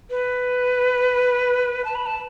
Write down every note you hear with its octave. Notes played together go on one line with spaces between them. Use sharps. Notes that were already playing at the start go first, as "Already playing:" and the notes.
B4
A5
B5
A5